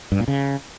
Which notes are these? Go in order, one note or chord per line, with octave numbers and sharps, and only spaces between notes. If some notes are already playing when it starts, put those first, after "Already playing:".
G2
A#2
C#3